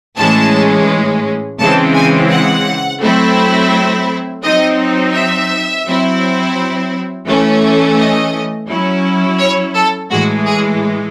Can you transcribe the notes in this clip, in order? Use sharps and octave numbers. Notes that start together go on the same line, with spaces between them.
A2 E3 G#3 C#4 A5
C#3 E3 G#3 C4 A5
G#5
F#5
F#3 A3 C4 E4
F#3 C4 D#4 D#5
E5
F#3 C4 E4
E3 A3 C#4
D#5
F#3 C#4 E4
C#5
A4
A2 E3 G#3 F#4
G#4